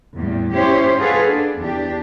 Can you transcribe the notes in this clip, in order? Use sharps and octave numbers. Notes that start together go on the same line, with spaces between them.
E2 A2 G3
C#4 E4 G4 C5 C#5
F4 F#4 G#4 A4 B4 F5
D4
E2 D4 G4